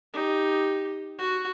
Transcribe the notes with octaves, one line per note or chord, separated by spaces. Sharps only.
D#4 G4
F#4